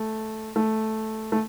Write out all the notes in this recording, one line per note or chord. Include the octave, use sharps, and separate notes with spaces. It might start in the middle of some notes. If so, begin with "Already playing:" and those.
Already playing: A3
A3
A3